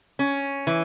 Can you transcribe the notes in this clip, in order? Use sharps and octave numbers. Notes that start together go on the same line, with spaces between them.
C#4
E3